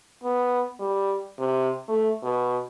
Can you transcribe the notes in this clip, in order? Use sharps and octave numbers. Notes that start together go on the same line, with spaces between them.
B3
G3
C3
A3
B2